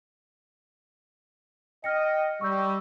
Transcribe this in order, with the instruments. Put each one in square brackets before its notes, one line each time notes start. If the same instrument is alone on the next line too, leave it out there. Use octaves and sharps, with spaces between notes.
[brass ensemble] D#5 G5 [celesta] F6 A#6 C#7
[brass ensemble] G3 [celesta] C#6 E6 G6